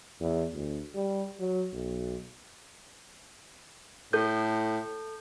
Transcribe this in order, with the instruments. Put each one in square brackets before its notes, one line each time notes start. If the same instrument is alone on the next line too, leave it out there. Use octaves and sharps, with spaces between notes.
[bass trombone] E2
D2
G3
F#3
B1
[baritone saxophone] A2 [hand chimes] A4 G6